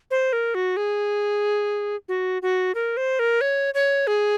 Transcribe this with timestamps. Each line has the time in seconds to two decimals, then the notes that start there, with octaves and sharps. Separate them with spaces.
0.11 C5
0.33 A#4
0.55 F#4
0.77 G#4
2.09 F#4
2.42 F#4
2.75 A#4
2.97 C5
3.19 A#4
3.41 C#5
3.74 C#5
4.07 G#4